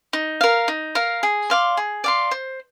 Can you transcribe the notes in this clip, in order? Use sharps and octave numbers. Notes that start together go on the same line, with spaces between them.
D#4
A#4 F5
D#4
A#4 F5
G#4
D5 F5 C6
G#4
D5 F5 C6
C5